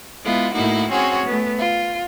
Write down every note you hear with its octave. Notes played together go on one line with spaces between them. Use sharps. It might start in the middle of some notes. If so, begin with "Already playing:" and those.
G#3 B3 E4 F4
A2 A#3 D#4 E4 F#4
C4 C#4 F#4 G#4 C#5
A3 B3
F4